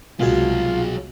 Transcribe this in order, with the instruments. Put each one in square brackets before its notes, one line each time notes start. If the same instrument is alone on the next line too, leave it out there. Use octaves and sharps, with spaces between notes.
[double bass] C2 [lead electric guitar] B2 F#3 [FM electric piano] G#3 F#4 G#4 [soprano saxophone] F4